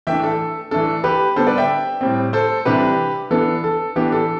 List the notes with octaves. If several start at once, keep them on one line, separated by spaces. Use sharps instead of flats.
E3 A3 D4 E5 G5
A4
E3 A3 D4 A4
G4 B4
D3 G3 B3 A4 C5
B4 D5
E5 G5
A2 G3 C4
A4 C5
C3 E3 G3 D4 G4 B4
E3 B3 D4 A4
A4
E3 B3 D4 G4
A4